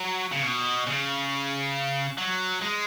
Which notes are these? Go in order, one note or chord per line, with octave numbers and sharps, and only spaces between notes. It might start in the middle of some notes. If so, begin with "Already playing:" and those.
Already playing: F#3
C#3
B2
C#3
F#3
G#3